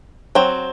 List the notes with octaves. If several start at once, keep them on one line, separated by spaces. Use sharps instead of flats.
F#3 C4